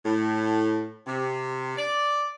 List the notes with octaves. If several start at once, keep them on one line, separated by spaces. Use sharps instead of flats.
A2
C3
D5